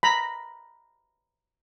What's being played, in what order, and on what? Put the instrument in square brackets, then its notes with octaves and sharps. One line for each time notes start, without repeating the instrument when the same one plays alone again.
[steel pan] A#5 B5